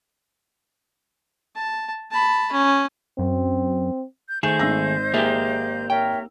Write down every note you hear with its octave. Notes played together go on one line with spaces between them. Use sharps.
A5
A5 B5
C#4
F#2 C4
G6
D#3 A3 G#4 C5 D#5 G6 E7
G#1 E6 A#6
A#3 G4 G#4 D5 E5
A#4 C#5 E5 G5